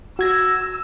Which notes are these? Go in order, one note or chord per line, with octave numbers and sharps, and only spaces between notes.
F#4 E6 G#6 A#6